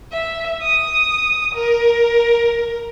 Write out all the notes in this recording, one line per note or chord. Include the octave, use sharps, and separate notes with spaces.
E5
D#6
A#4